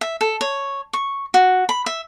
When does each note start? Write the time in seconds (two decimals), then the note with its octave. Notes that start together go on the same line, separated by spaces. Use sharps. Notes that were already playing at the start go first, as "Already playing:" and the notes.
0.01 E5
0.21 A4
0.41 C#5
0.93 C#6
1.34 F#4
1.69 B5
1.86 E5